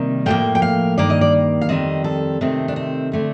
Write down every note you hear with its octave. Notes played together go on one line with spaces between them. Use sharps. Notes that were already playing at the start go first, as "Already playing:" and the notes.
Already playing: C3 D#3 G3 A#3
A2 F3 A#3 G5
G5
F5
G2 D#3 A#3 D5
D#5
D5
F5
F2 D#3 G3 C4 D#5
A4
C3 D#3 A3 C4
D4
C4
D3 A3 C4